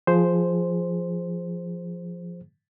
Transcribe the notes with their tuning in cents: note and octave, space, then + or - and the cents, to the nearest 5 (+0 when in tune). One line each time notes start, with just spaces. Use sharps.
F3 +0 G#4 +0 C5 +0